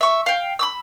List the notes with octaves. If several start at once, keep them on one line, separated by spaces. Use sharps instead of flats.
E5 C#6
F5 G5
B5 D6 E6